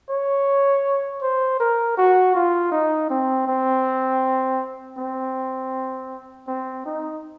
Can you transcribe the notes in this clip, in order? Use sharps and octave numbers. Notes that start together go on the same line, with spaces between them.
C#5
C5
A#4
F#4
F4
D#4
C4
C4
C4
C4
D#4